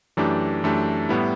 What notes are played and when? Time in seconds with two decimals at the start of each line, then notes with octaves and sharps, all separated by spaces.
0.17 F#2 E3 A3 D4 G4
0.63 F#2 E3 A3 D4 G4
1.09 A2 G3 B3 E4